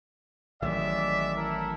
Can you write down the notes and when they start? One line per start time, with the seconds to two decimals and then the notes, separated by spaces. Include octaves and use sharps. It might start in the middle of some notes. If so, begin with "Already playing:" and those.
0.62 A1 D#3 F#3 G#3 D5 E5
1.35 E4 A4 A#4